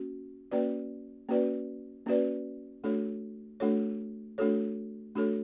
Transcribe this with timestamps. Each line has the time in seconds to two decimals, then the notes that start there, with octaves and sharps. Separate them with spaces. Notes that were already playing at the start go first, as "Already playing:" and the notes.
Already playing: A#3 C#4 F#4
0.51 A#3 C#4 F#4 B4 D5
1.29 A#3 C#4 F#4 B4 D5
2.06 A#3 C#4 F#4 B4 D5
2.84 A3 D4 F#4 A4 C#5
3.60 A3 D4 F#4 A4 C#5
4.38 A3 D4 F#4 A4 C#5
5.15 A3 D4 F#4 A4 C#5